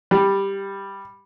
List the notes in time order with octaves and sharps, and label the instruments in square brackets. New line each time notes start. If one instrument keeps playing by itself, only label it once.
[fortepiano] G3